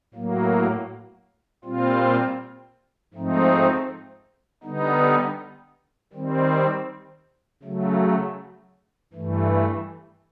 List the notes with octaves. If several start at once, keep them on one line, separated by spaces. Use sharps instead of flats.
A2 F#3 A#3
A#2 G3 C4 F4
G#2 F3 A3 C4 D#4
D3 G3 B3 D#4
D#3 G3 C4
C#3 F#3 A3
G2 E3 A3